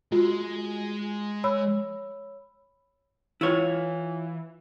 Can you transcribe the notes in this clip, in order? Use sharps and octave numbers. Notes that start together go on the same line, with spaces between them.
G#3 F4 F#4
C#5 B5 E6
E3 E4 F4 C#5